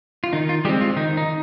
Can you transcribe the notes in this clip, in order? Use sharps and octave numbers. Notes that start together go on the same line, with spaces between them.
F4
D#3 D#4
F4
G3 G#3 C4 G4
F4
D#3 D#4
D#4